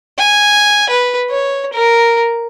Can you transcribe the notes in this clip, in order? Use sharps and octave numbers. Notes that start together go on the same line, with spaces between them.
G#5
B4
C#5
A#4